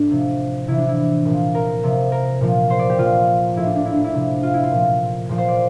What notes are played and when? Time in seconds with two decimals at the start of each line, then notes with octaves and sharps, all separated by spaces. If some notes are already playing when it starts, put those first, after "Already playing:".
Already playing: A2 D4
0.11 C3 F3
0.68 C3 E3 E4
0.78 D4
0.88 E4
1.25 A#2 F3
1.55 A#4
1.83 C3 F3
2.12 A#4
2.41 A#2 F3
2.70 C5
2.79 D5
2.89 G4
2.99 A#2 F3 F4
3.56 A2 F3 E4
3.66 D4
3.76 D4
3.86 E4
3.95 D4
4.04 E4
4.14 C3 F3
4.43 F4
4.54 E4
4.63 F4
4.71 A#2 F3
5.29 A#2 F3
5.38 C5
5.48 D5